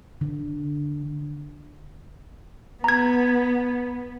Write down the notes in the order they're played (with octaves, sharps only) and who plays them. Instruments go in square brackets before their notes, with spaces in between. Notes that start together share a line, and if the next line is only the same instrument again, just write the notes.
[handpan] D3
[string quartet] B3 [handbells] A#5 G#6